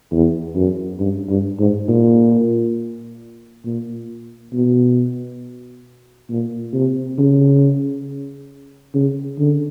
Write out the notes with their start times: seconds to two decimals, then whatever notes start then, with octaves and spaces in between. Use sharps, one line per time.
0.12 E2
0.55 F#2
1.00 G2
1.29 G2
1.59 G#2
1.88 A#2
3.65 A#2
4.53 B2
6.29 A#2
6.74 C3
7.18 C#3
8.95 C#3
9.39 D3